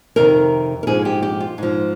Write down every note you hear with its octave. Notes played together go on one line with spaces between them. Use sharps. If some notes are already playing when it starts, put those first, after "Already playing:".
F2 C3 D#3 A#4
A#4
G#2 F3 G#4
G4
G4
F4
G#2 F3